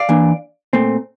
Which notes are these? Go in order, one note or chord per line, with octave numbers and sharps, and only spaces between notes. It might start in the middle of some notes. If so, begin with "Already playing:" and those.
Already playing: D5 F5
E3 A#3 D4
A#2 A3 C4